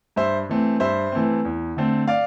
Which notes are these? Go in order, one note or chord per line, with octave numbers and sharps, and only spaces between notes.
G2 C5 E5
E3 A3 C4
G2 C5 E5
E3 A3 C4
E2
D3 A3 C4
D5 F5